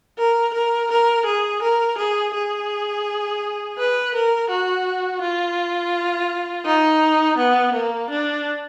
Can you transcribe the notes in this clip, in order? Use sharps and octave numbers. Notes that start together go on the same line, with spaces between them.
A#4
A#4
A#4
G#4
A#4
G#4
G#4
B4
A#4
F#4
F4
D#4
B3
A#3
D4